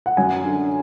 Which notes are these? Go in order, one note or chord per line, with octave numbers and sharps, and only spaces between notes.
F#5
F#2 G#5
D3